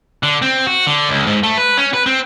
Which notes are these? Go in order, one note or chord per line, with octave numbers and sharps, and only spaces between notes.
D3
C4
F#4
D3
C#2
G#2
A3
B4
C#4
B4
C4